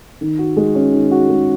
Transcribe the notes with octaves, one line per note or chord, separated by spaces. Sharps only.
D#3
F#4
G#3
C#4
D#3
F#4
G#3